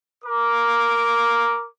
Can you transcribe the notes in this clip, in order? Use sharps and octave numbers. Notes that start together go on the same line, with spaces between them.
A#4 D6